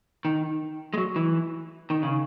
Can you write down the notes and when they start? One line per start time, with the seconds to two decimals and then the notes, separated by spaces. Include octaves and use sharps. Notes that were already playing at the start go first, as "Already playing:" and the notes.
0.25 D#3
0.94 G#3
0.98 F#3
1.16 E3
1.90 D#3
2.03 C#3